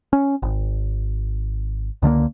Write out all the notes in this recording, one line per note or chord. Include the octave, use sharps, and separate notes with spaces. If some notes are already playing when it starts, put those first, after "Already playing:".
C#4
G#1
C#2 D3 A3 A#3